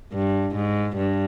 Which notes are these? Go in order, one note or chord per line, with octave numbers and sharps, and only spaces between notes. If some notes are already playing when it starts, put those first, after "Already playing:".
G2
G#2
G2